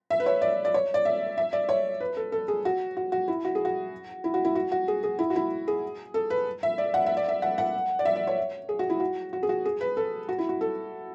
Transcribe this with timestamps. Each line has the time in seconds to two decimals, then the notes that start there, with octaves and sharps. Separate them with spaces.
0.10 E5
0.20 B4
0.26 C#5
0.42 D5
0.65 D5
0.74 C#5
0.94 D5
1.05 E5
1.38 E5
1.53 D5
1.69 C#5
2.00 B4
2.17 A4
2.32 A4
2.48 G#4
2.65 F#4
2.97 F#4
3.12 F#4
3.28 E4
3.45 F#4
3.55 G#4
3.65 F#4
4.24 E4
4.34 F#4
4.45 E4
4.55 F#4
4.72 F#4
4.88 G#4
5.03 G#4
5.19 E4
5.30 F#4
5.36 E4
5.68 G#4
6.14 A4
6.30 B4
6.63 E5
6.78 D5
6.94 F#5
7.06 E5
7.17 D5
7.29 E5
7.42 F#5
7.58 F#5
7.99 D5
8.05 E5
8.16 D5
8.27 C#5
8.69 G#4
8.79 F#4
8.90 E4
9.00 F#4
9.33 F#4
9.43 G#4
9.49 F#4
9.65 G#4
9.81 B4
9.97 A4
10.29 F#4
10.38 E4
10.49 F#4
10.61 A4